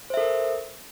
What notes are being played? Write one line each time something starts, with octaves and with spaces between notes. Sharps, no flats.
A4 A#4 C5 E5